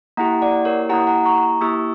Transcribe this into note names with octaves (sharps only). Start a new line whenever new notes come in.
A#3 E4 G4 F#5 A#5
D5 F#5
A#4 C#5
A#3 E4 G4 F#5 A#5
F#5 A#5
A#5 C#6
A#3 E4 G4 C#6 E6